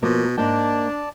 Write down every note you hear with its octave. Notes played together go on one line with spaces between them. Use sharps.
B2 F3 A#3
G#2 A#3 D4 D5 G5 A5